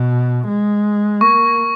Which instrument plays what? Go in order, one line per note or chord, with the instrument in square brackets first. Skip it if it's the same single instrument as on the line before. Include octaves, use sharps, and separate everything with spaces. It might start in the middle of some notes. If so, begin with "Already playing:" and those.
Already playing: [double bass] B2
G#3
[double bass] A#3 [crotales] C#6